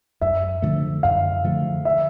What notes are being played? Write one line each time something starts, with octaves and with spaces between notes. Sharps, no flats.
F#2 E5
D3 F3 A3
F#2 F5
D3 F3 A3
E5